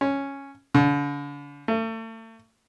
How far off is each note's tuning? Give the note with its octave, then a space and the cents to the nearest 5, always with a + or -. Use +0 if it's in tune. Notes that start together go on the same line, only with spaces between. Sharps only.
C#4 -5
D3 -40
A3 +35